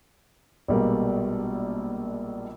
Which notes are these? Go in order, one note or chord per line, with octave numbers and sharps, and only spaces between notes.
A#1 B2 G3 G#3 A#3